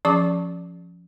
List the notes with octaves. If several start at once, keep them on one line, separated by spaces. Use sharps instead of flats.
F3 C#4 G#4 C#6 D6